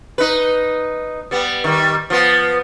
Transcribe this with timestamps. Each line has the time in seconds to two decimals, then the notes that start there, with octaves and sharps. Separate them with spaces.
0.18 D#4 B4
1.31 G3 B3
1.64 D#3 G3
2.10 F3 B3